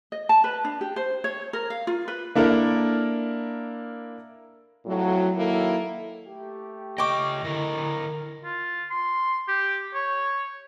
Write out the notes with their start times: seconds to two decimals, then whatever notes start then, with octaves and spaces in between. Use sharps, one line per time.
0.12 D#5
0.29 A5
0.44 B4
0.65 D4
0.81 G4
0.96 C5
1.24 C#5
1.53 A#4
1.70 F5
1.87 F4
2.08 B4
2.35 A#3 D4 E4 A4 A#4
4.86 F2 A2 F#3
5.36 D#3 F#3 A#3 E4 A4
6.25 A3 G4
6.98 C#3 D#5 G5 C#6 D6
7.44 D3 E4 A#4 D#5
8.44 F4
8.90 C6
9.48 G4
9.94 C#5